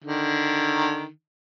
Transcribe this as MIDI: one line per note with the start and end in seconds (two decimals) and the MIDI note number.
0.04 1.07 50
0.04 1.07 51